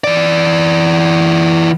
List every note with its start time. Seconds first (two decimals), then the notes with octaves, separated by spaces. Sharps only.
0.04 E3 D5